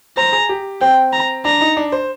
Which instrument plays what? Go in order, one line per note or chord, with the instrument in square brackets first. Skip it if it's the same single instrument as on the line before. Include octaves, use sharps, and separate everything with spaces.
[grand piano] C5 [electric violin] A#5
[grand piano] G#4
G4
[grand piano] C4 [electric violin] G5
[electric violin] A#5
[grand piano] D4 [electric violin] A#5
[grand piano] D#4
D4
C5